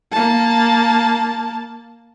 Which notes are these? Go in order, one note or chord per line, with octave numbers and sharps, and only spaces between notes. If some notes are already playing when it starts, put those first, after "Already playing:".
A#3 A5